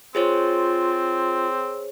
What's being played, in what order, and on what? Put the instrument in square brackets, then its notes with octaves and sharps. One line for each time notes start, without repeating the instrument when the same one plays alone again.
[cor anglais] C4 [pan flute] F4 [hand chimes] G#4 C5 C#5